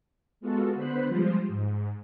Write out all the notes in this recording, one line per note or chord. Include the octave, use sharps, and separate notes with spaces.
G#3 B3 F4 F#4 A4
D3 B3 C5 B5 F#6
F3 G3 G#3 F4 C5
G#2